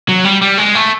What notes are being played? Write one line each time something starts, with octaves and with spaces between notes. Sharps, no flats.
F#3
G3
G3
G#3
A3